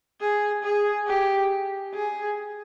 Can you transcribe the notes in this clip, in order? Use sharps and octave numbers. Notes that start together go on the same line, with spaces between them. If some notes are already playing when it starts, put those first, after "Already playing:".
G#4
G#4
G4
G#4